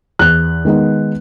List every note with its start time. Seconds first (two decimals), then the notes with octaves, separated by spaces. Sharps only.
0.19 E2 F#6
0.65 D#3 G#3 B3 D#4